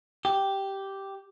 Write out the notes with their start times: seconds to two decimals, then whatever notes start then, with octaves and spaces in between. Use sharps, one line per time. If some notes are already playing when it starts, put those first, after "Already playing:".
0.25 G4